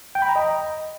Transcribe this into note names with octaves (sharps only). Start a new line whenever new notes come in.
G5
B5
A#5
D#5